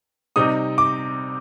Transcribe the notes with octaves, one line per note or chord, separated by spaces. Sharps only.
C3 G3 C4 D#4 D#6
D6